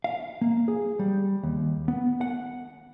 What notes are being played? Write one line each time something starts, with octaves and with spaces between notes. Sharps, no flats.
F5
A#3
G#4
G3
D#2
B3
F#5